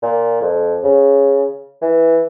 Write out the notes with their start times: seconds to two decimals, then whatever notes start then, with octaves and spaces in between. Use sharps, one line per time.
0.02 A#2
0.42 F2
0.83 C#3
1.82 E3